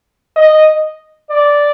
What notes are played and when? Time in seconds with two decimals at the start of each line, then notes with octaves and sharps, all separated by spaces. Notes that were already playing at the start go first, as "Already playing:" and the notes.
0.36 D#5
1.30 D5